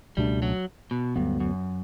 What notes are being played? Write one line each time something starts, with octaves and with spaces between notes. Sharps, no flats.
C#2 B2 G3 A3 D4
F#3
B2
D2 G2 D3 F#3 B3
F#2